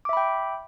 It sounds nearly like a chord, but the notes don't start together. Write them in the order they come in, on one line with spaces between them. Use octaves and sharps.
D6 E5 B5 G5